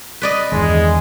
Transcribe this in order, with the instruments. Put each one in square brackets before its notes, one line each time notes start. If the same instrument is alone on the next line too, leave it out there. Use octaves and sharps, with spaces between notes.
[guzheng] B4 D5 D#5
[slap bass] E2 G2 D#3 [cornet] G#3